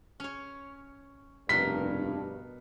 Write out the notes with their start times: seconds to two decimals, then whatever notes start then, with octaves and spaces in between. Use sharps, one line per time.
0.20 C#4 C#5
1.49 F1 G2 B2 A#4 C6 B6